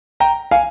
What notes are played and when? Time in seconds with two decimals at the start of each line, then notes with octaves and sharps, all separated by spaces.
0.20 G5 A#5
0.51 F5 G#5